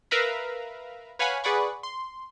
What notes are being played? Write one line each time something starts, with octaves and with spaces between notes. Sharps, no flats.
A#4 B4 E5 F5 A#5 B5
B4 C#5 F5 F#5 G#5 B5
G#4 B4 D5 F#5 B5 C#6
C6